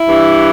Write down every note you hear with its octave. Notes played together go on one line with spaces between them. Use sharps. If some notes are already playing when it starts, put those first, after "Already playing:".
Already playing: E4
G2 E3